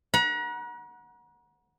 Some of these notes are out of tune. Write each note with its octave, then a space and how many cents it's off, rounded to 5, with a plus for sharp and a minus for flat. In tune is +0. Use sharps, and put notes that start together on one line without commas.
F#5 -10 A#5 +40